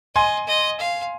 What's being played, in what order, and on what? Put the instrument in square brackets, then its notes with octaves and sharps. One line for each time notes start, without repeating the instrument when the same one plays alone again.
[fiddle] D#5 [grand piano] G#5 C6
[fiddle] D#5
F5